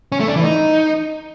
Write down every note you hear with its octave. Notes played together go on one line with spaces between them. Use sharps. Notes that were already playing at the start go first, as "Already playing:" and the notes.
C#4
A3
D4
E3
D#4